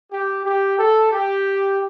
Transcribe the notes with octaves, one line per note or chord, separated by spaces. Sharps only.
G4
G4
A4
G4